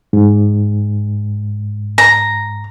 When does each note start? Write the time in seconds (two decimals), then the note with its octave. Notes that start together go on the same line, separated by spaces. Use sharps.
0.13 G#2
1.98 A#5